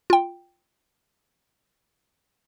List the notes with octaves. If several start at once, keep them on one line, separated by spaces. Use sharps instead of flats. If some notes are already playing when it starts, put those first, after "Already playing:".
F4 G5